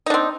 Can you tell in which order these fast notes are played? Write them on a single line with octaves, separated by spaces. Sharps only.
D#4 D4 C4